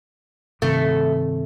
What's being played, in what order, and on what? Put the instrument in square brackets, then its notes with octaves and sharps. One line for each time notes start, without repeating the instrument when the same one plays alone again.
[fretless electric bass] G2 C3 D#3 [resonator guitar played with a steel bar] A3